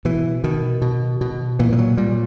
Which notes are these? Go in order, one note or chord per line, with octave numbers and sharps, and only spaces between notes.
B2 E3
B2 D#3
B2
B2
A#2 E3
F3
F#3
A#2 G3